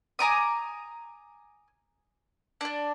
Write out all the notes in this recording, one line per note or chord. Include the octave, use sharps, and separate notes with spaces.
G#5 A#5 D6 D#6
D4 D5